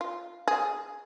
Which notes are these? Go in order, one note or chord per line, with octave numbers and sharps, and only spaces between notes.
F4
G#4